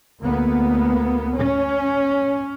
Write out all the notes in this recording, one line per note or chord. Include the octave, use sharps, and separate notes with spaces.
D2 A#3 B3
C#4